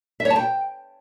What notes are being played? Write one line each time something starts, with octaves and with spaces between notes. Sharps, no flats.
E5
C#5
A5
G5